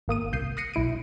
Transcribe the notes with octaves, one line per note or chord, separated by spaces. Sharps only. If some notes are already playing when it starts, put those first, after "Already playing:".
G#1 A#3 D#6 D#7
C2 G6 C7 D#7
D#6 F#6 A#6 C7 C#7 D#7
B1 E4 D7 D#7